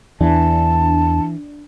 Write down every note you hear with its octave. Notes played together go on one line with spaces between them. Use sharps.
E2 E3 D4 A5